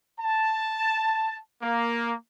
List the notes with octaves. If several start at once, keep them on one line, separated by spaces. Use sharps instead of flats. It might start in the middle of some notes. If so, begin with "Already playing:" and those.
A5
A#3